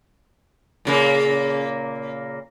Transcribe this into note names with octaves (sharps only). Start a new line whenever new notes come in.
A#2 C#3 A#3